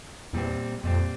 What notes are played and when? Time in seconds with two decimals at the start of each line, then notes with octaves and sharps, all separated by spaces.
0.33 E2 A#2 G3 C4
0.83 F2 A#2 G3 C4